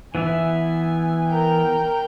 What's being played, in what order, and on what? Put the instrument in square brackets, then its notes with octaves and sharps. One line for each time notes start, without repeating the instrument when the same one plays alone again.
[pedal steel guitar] E3 B3 E5 [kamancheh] G#5
[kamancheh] A#4 G5